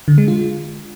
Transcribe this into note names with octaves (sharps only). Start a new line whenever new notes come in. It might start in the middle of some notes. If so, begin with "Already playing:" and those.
D3
G#3
F4